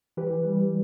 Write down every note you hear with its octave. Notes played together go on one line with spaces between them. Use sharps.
E3 G4 B4
G3